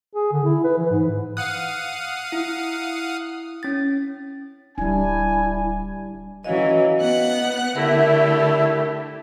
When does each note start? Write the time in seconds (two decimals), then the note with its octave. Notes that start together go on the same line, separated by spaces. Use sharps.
0.15 G#4
0.32 D3
0.44 E4
0.64 B4
0.78 E3
0.91 G#2
1.37 F5 F#5 D#6 F#6
2.32 E4
3.63 C#4 A6
4.78 D1 G3 D4 E4 G#5
6.44 E3 F#3 C#4 D#5 F5
7.00 B3 F#5 F#6
7.76 D3 A3 E4 G4 A#4 E5